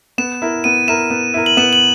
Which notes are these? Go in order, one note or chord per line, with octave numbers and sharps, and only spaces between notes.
B3 E7
E4 A#4
B3 D#7
E4 A#4 E7
B3
E4 A#4
F#7
B3 E7
F#7